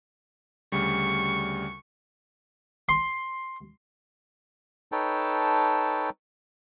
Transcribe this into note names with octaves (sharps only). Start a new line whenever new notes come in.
D2 C#3 G3 C#6
C6
D#4 A4 B4 C#5 G5 A5